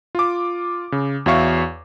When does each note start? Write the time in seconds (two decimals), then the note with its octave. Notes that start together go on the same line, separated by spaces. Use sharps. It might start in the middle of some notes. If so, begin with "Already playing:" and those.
0.15 F4 D6
0.92 C#3
1.26 E2 F#4 C#5 E5 F5 C#6